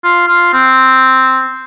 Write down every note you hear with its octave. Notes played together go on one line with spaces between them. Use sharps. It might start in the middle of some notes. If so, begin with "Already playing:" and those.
F4
F4
C4